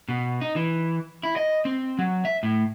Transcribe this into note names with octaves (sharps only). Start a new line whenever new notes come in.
B2
D#4
E3
E4
D#5
C4
F#3
E5
A2